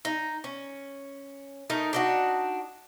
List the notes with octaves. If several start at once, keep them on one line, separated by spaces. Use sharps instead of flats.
D#4
C#4
A3 D#4 A#4
D4 D#4 F#4